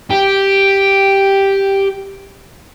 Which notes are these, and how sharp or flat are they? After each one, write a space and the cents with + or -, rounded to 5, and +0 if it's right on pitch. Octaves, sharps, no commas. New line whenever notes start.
G4 +0 G5 +0